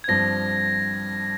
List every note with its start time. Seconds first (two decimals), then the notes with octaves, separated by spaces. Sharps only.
0.04 G#6
0.08 G2 F3 C4 A#6